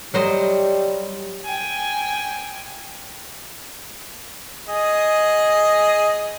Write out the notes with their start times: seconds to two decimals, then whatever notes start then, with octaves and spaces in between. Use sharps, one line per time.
0.14 F#3 G3 C5 D#5
1.45 G5 G#5
4.68 G#4 D#5